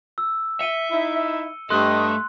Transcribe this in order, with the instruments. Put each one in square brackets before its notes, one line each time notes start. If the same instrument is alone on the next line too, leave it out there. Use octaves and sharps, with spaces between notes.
[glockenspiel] E6
[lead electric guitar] E5 [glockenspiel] C#7 D#7 G7
[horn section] D#4 E4
[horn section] G2 G4 D#5 [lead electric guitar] A3 A4 [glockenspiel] C6 F#6